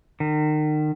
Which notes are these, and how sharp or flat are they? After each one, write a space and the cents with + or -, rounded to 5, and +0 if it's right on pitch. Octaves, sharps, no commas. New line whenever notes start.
D#3 -35